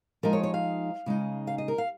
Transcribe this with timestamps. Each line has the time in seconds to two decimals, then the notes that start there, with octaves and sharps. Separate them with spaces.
0.23 F3 G#3 D#4 A#4
0.33 C#5
0.43 C#5
0.54 F5
1.06 C#3 G#3 D#4
1.47 F5
1.58 D#5
1.68 A#4
1.78 F5